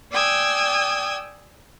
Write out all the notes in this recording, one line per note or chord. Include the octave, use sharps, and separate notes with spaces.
D5 G5 G#5 D#6 E6